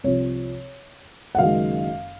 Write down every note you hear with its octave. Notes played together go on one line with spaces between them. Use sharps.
C2 C3 F3 C#5
F#5
F#1 F#2 D#3 G#3 F5